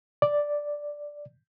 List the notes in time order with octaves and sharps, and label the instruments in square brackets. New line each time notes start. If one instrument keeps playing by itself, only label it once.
[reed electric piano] D5